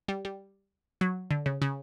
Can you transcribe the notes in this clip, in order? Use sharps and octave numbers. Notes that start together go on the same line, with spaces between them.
G3
G3
F#3
D3
C#3
C#3